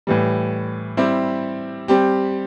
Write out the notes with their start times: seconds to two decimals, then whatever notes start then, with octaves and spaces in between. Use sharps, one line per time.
0.07 A2 E3 G3
0.97 G3 C4 E4 G4
1.88 G3 C4 G4